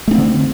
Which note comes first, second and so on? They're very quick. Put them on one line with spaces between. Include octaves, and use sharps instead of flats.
A3 D4 C4 D3